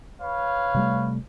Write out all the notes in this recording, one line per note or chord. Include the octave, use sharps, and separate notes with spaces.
B4 C#5 F5
C3 G3 A3